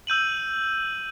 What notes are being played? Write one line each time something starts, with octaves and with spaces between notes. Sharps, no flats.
E6 G6 D#7 F#7